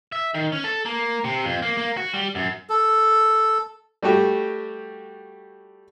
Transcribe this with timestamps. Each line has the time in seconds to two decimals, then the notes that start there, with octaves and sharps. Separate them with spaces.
0.12 E5
0.34 D#3
0.52 C#4
0.64 A4
0.85 A#3
1.24 C3
1.45 F2
1.62 A#3
1.77 A#3
1.97 F#4
2.14 G3
2.35 F#2
2.70 A4
4.03 G3 A3 F#4 G4